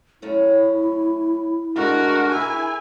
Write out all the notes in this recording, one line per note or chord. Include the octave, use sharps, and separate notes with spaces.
F#2 A3 C#4 E4
D3 G#3 A3 D4 F#4 A#4
E4 G#4 A#4 G#5